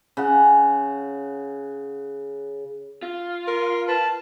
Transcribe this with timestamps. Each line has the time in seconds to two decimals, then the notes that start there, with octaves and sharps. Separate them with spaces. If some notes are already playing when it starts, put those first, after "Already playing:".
0.17 C#3 F#5
3.03 F4
3.47 A#4 C6
3.88 B4 A5